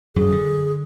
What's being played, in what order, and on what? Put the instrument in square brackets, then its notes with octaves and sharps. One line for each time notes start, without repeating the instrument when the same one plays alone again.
[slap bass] F#2 F#3 [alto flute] G#4
[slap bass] D3